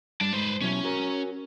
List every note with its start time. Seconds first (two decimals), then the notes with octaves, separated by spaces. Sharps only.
0.21 G2 D5 A5
0.33 G#2 B4 C5
0.62 B2 F#3 C#4 E4
0.84 F#4 A#4 C#5